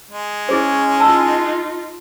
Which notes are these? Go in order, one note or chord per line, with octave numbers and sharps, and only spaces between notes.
G#3
C#4 E4 G#4 C5 C#5
D#4 F4 A5 E6